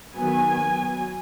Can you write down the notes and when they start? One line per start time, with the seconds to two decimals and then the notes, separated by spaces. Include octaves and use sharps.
0.15 D#3 F#3 B3 G#5
0.62 F#3 B3